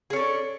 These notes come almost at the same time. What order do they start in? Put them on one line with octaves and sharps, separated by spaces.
G#4 C#4 A4 D4